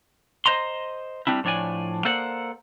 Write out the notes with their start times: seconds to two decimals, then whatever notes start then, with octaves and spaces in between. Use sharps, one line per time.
0.46 C5 D#5 A#5 C6
1.27 G3 C4 D4 E4
1.44 A2 F3 D4 C#5 D5 G#5
2.05 A#3 A4 C5 D5 F#5